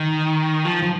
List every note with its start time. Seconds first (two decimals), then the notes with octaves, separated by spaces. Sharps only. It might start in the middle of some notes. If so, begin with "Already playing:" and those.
Already playing: D#3
0.65 F3
0.82 F3